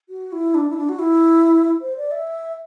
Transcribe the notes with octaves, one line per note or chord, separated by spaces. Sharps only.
F#4
E4
D4
E4
D4
F#4
E4
C5
D5
E5